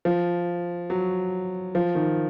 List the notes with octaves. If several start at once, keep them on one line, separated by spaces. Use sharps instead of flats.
F3
F#3
F3
D#3